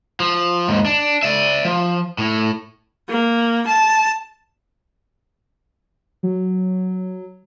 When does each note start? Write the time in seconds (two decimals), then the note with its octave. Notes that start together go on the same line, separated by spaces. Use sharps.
0.20 F3
0.68 D#2 G#2
0.86 D4
1.23 D5 E5
1.65 F3
2.18 A2
3.09 A#3
3.67 A5
6.23 F#3